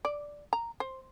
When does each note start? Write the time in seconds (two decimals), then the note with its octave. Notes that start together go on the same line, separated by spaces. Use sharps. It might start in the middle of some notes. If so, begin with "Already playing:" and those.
0.05 D5
0.53 A#5
0.80 C5